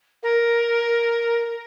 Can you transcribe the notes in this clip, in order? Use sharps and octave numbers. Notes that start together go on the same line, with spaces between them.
A#4